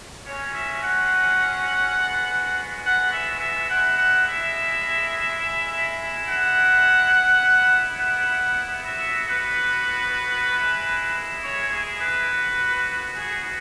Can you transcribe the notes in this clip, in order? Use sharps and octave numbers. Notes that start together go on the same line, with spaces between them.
G#3 C#4 F#4 C#5
E5
F#5
G#3 B3 F#4
F#5
E5
E5
G#3 E4 F#5
F#5
E5
G#3 E4
F#5
B3 E4
F#5
B3 F#4 E5
B4
G#3 E4
C#5
G#4
B4
B3 F#4
G#4